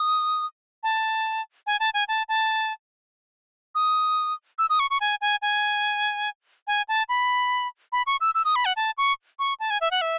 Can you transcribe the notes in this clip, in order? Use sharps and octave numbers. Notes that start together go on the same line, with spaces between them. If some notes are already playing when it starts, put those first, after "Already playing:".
Already playing: D#6
A5
G#5
A5
G#5
A5
A5
D#6
E6
D#6
C#6
C#6
G#5
G#5
G#5
G#5
A5
B5
B5
C#6
E6
E6
D#6
B5
F#5
A5
C#6
C#6
A5
G#5
E5
F#5
E5